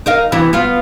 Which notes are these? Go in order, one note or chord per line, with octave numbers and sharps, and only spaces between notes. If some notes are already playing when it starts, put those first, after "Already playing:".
D#4 A#4 F5
C3 E3 B3
B3 F4